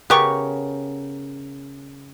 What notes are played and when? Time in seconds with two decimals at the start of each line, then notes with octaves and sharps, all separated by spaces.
0.10 C#3 B3 G4 A#4 C#5 C#6